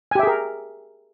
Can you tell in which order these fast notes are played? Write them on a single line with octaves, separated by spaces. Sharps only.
G#5 G4 E5 G#4 A#4